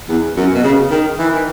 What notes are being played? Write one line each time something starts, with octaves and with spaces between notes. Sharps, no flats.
E2
F#2
B2
C#3
D#3
E3
D#3